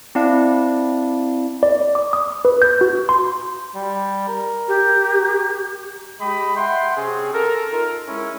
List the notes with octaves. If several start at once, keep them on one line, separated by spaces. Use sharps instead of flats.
C4 E4 D5 F5 A5
D5
D6
D#6
B4
G6
F#4
C6
G3
A#4
G4
G#3 G4 D#5 B5
E5 F#5 G5 C6
C3 C4 C#4 G#4
A4 A#4
D#4 F4 A#4
G#3 C#4 E4